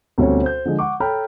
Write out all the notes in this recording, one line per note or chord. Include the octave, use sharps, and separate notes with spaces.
D2 B2 G3 C4 C#4 C#5
C5 G6
D3 F3 G#3
F#5 C#6 D6
A4 C#5 G5 A#5 B5 F6